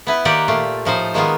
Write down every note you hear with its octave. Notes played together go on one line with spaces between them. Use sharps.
B3 E4 B4
D#3 A#3 G4 D5 F#5 G5
A#2 A3 F4
A2 F3 D#4 C5
D#3 G#3 A#3 B3 F4